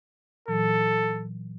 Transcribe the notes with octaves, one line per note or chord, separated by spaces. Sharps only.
A#2 E3 F#3 A4